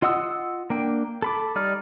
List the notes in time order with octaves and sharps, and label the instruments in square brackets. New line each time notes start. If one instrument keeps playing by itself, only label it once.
[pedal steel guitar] F4 D#5 F#5 D#6 E6
A#3 D4 G5
A4 B5 D6
G3 D#4 D5 F6